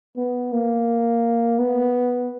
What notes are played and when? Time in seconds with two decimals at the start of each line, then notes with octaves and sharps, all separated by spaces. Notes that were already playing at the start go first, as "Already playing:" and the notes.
0.17 B3
0.53 A#3
1.59 B3